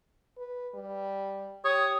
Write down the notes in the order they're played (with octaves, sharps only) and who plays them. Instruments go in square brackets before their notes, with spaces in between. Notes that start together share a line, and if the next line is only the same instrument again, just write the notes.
[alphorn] B4
G3
[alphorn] G4 [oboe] C#5 [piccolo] D#6